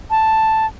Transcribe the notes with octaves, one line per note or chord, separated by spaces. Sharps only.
A5